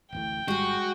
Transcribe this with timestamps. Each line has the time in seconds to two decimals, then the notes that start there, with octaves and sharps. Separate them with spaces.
0.12 D1 A1 A2 G5
0.48 G#1 G3 G#3 F#4 G#4